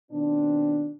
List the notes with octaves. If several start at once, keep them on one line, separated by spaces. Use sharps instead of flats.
B2 D#3 C4 D4